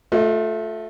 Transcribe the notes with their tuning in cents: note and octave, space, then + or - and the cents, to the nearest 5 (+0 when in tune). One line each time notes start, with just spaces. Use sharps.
A3 +0 F4 +40 D#5 +30